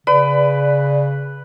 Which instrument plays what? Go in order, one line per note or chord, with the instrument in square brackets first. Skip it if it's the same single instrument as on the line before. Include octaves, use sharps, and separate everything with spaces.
[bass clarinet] C#3 [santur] B4 [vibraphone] D5